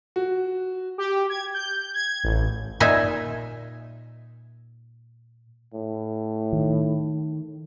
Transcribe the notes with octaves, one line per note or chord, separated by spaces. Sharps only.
F#4
G4
G#6
G6
G#6
A1
A#2 D#4 E5 G#5
A2
D#3